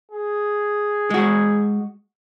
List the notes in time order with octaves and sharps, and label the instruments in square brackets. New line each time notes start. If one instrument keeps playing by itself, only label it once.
[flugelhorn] G#4
[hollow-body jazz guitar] G#3 F#4